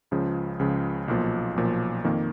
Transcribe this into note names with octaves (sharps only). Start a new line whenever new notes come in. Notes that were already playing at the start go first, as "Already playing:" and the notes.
C#2 C#3 F3
C#2 C#3 F3
B1 A#2 F3
B1 A#2 F3
F2 D#3 A#3